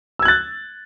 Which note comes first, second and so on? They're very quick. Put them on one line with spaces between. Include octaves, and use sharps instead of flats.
E6 G#6 F#6 A6